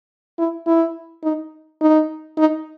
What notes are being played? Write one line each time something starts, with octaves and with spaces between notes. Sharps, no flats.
E4
E4
D#4
D#4
D#4